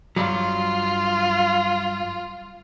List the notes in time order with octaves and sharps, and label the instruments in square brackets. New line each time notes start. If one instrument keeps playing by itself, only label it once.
[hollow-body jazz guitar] G2 F#3 [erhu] F4